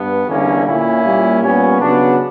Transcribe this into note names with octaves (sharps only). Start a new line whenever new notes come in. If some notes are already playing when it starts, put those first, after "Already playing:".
Already playing: G2 B3
E2 D3 G3 A#3 C#4 E4
A#2 A#3 C#4 E4
A#2 G3 A#3
A#2 G3 B3 C#4
C#3 F#3 B3 D4